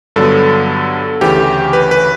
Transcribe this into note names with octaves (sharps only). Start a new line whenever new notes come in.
G2 D3 F#3 B3 A4
D2 C#3 E3 G4
B4
B4